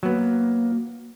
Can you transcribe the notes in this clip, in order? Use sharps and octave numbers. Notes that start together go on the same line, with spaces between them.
F#3 A#3 B3